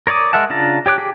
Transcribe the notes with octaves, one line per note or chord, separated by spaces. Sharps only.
A#4 C#5 D5 D6 D#6
G#3 A#4 E5 F#5 A5
C#3 D4 F4 A5 A#5
G4 C#5 D6 F#6
G4 G#4 G5 D6